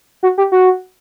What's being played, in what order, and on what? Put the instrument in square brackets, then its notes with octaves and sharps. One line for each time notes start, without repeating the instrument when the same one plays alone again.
[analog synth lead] F#4
G4
F#4